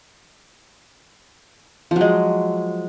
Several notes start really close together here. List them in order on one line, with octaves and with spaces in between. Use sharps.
F3 F#3 G#3